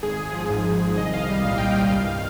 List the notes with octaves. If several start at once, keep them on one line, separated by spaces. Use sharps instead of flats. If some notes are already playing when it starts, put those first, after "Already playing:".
G#1 G#4
G#1
F3
G#2
G#1
G#1
C2 D#5
C2 F5
G3
A#2 F5
C2 G5
C2 F5
G2